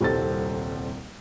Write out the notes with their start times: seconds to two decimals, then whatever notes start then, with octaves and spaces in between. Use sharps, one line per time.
0.01 D#1 C2 C4 A4 A6